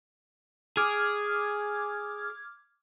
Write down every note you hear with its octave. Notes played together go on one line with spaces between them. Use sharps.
G#4 D6 F6 G#6